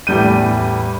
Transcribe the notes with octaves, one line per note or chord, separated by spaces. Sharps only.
E2 A2 G3 G6 D#7